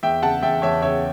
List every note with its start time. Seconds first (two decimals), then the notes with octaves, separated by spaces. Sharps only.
0.03 E2 E5 G5
0.23 C#3 F#5 A5
0.42 E2 E5 G5
0.62 E2 C#5 E5
0.82 C#3 C#5 E5